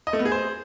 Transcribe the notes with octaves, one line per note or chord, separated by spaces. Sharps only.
D#5
A3
B3
G#4
C5